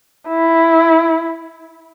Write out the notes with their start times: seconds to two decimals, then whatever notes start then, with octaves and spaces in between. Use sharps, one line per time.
0.28 E4